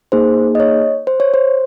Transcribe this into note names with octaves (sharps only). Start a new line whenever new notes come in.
A#3 D#4 G#4 C5
D#5
C#5
C5
C#5
C5